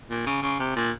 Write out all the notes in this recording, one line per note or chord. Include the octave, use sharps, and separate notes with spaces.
A#2
C#3
C#3
C3
A#2